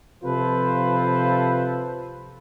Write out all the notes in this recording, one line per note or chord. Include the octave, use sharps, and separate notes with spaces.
C3 F3 F4 A4 B4 C5